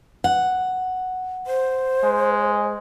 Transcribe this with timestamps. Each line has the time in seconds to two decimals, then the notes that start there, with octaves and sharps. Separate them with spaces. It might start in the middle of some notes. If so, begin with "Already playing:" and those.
0.24 F#5
1.47 C5
2.04 G#3